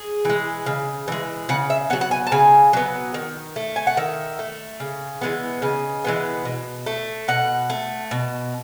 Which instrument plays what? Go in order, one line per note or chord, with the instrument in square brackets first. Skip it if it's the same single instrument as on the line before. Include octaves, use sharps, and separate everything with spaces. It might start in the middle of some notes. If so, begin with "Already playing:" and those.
Already playing: [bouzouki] G#4
E3 G#3
C#3
E3 G#3
C#3 F#5
E5
F#3 B3 F#5
F#5
G#5
A5
C#3 G#5
F#3 B3
D#3
A3
G#5
F#5
D#3 E5
A3
C#3
E3 G#3 B3
C#3 D#5
E3 G#3 B3
B2
A3
B2 F#5
A3
B2